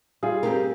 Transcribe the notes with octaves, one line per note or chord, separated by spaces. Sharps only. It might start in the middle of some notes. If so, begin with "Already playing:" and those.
G3 F4 G#4
C4 G4 A#4